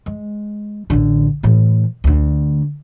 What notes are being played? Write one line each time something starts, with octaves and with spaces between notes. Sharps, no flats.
G#3
A1 D3
A2 E3
D2 D3